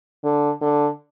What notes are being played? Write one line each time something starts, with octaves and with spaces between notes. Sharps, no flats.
D3
D3